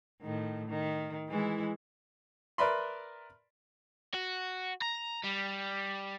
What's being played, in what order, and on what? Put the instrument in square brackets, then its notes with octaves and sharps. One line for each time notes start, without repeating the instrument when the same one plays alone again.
[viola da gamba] A2 D#3
D#3
E3 G#3 E4
[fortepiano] A#4 B4 D5 E5 B5 C6
[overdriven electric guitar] F#4
A#5
G3